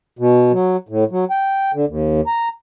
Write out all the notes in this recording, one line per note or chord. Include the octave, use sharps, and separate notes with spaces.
B2
F#3
A2
F#3
G5
D3
D#2
A#5